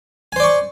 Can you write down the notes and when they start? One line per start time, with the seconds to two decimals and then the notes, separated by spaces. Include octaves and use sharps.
0.32 G#5
0.36 C5
0.40 D5
0.44 C#6